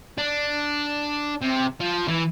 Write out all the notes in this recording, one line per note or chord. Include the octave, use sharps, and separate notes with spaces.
D4
C3
F3
E3